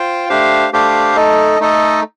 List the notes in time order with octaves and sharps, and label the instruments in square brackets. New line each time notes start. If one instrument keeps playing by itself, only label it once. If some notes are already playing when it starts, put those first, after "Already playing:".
Already playing: [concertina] F4 C5 G5
A3 D4 G4 C5 F5
A3 D4 G4 C5 F5
A3 D#4 A4 D#5
A3 D#4 A4 D#5